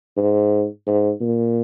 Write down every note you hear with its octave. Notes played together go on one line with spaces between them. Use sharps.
G#2
G#2
A#2